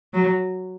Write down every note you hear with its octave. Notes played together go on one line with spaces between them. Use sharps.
F#3